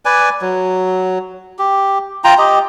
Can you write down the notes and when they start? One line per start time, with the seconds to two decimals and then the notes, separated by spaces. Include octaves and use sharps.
0.05 B4 D5 G#5
0.41 F#3
1.59 G4
2.24 F4 G5 A#5
2.38 G4 D#5